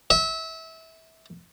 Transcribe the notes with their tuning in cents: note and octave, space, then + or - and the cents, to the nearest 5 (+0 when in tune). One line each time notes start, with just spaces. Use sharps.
E5 -25